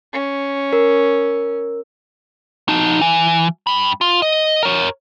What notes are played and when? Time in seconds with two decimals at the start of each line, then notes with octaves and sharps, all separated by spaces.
0.13 C#4
0.73 A#4
2.68 F3 D#4
3.01 E3
3.67 G2 B5
4.01 F4
4.22 D#5
4.63 A#4 C#5